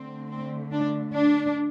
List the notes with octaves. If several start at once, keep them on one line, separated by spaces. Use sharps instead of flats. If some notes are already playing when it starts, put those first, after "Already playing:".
Already playing: D3 A3 C4
C4
D4
D4